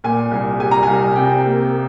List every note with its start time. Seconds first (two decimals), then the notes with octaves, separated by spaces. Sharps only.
0.04 A#2 G#5
0.31 C2
0.60 G3 G#5
0.71 A#5
0.83 C2 G#5
1.16 C3 G5
1.44 A#3